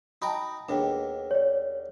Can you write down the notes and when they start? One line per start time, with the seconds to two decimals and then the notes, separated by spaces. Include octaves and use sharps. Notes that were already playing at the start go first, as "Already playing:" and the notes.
0.22 D#4 F#4 G5 A5 B5
0.69 D#2 B2 D4 G#4 G5
1.31 C#5 D5